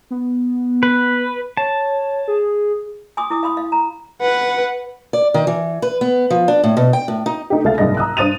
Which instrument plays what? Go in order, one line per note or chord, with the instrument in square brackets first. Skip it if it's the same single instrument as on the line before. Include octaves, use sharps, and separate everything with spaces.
[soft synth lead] B3
[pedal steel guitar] B4
[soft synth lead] C#5 [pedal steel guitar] A5
[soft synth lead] G#4
[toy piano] G#5 C6 D6 D#6
E4 D6 D#6
F5 B5 C6 D#6
F5
A#5
[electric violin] B4 F#5
[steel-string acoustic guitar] D5
D#3
E3
B4
B3
F3
D4
A2
B2
G5
A2
D#4
[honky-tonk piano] A3 D#4 G4
C#2 A3 E5 F5 A6
F#1 C2 G#2 G#4 D#5 A#6
A#5 D#6 E6 F#6
G2 C5 D#6 A6 D#7 F7